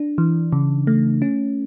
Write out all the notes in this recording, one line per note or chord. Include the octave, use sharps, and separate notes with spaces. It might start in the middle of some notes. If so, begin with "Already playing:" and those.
Already playing: D4
E3
C#3
A3
C#4